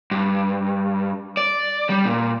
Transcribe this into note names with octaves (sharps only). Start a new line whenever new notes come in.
G2
D5
G3
A#2